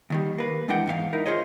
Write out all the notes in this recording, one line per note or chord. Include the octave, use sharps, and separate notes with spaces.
D#2 D#3 G3
A#3 B4
E2 G#3 D4 E4 F#5 G5
E2 G#2 G4 F5
D#4 E4 A#4
F4 G#4 C5 C#5 D#5